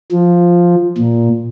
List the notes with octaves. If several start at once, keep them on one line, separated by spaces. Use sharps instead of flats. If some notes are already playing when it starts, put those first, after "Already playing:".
F3
A#2